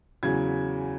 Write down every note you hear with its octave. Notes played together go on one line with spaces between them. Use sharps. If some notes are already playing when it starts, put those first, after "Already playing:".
E2 C#3 F#3 G#6